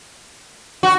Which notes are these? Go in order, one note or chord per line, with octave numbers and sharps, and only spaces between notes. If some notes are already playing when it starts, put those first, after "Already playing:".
F#4